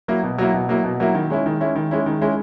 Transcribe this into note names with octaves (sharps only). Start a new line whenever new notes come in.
F#3 A#3 E4
B2
F#3 A#3 E4
B2
F#3 A#3 E4
B2
F#3 A#3 E4
D#3
G#3 C#4 E4
D#3
G#3 C#4 E4
D#3
G#3 C#4 E4
D#3
G#3 C#4 E4